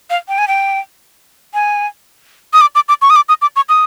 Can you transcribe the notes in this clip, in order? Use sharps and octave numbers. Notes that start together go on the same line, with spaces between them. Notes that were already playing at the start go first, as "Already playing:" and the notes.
F5
G5
G#5
G5
G#5
D#6
D6
D6
D6
C#6
D#6
D6
D#6
D6
C#6
D#6